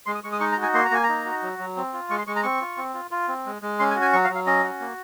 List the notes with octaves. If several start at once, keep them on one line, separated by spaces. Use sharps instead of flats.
G#3 C6
D#6
G#3 C#6
D#6
D#4 C#6
A#5
F#4
G#5
A#3 C6
A#5
A#3 G#5
A#5
D#4
F#4
F#3
F#3
C4
F4
G#3 C#6
C6
G#3 C#6
A#5
C4 C#6
F4
C4
F4
F4
C4
G#3
G#3
C#4 C6
G#5
F#4
G#5
F#3 C#6
F5
F#3
F5
C#4 D#5
F#4
A#3